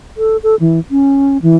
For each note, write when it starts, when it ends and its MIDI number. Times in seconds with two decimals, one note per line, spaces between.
0.17 0.37 69
0.43 0.56 69
0.60 0.79 52
0.91 1.38 61
1.42 1.57 52